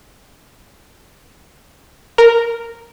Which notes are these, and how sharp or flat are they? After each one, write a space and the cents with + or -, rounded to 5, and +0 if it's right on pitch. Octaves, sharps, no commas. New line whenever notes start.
A#4 -5